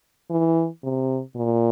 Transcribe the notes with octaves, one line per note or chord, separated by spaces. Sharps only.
E3
C3
A#2